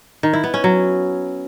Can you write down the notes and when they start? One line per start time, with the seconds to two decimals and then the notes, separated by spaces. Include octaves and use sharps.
0.23 D#3
0.33 E4
0.44 B3
0.54 C#4
0.64 F#3